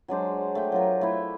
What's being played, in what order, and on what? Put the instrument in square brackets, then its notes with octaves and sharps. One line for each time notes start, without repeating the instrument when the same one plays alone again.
[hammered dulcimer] F#3 G#3 D4 C5
A3 G5
F#3 F4 A#4
A3 E4